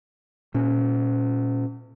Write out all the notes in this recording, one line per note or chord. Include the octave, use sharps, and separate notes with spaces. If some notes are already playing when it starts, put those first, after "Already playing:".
A#2 C#4